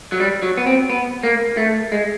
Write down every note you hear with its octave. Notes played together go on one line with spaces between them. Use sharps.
F#3
G3
F#3
B3
C4
B3
A#3
A3
G#3